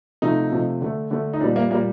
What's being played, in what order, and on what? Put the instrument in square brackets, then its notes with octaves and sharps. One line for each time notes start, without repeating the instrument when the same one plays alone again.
[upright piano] C3 F3 A3 D#4
C3 F3 A3
D3 A3
D3 A3
D#4
A#2 G3 D4
A#3
A#2 A#3
G3